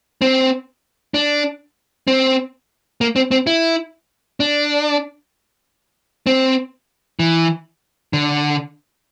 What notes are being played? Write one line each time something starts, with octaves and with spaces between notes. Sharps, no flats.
C4
D4
C4
A#3
C4
C4
E4
D4
C4
E3
D3